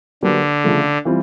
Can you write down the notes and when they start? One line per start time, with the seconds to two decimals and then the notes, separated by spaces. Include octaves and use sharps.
0.23 D3 F#3 A#3 D4 G4 B4
0.64 C#3 F3 A3
1.05 E3 G3 C4 F4